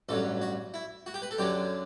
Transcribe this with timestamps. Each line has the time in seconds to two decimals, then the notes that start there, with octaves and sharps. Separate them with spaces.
0.09 A1 G2 F#3 A4
0.42 F#4
0.74 E4
1.06 F#4
1.14 G4
1.22 B4
1.31 A4
1.38 F#2 D3 F#3 G4